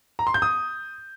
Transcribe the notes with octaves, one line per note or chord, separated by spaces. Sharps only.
A#5
C6
G6
D#6